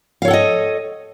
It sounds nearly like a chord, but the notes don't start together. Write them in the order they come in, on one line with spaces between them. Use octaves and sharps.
F5 C#5 A4 F#5 D#5